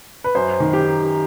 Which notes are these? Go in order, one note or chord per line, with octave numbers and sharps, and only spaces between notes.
B4
F#2 C5
D#3
G4